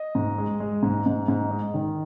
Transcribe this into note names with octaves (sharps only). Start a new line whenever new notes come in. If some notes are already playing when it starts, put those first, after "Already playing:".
Already playing: D#5
G#2
G#3
G#3
G#2
G#2
G#2
G#3 D#5
D#3